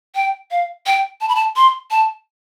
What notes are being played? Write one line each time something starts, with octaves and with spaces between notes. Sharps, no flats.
G5
F5
G5
A5
B5
A5
C6
A5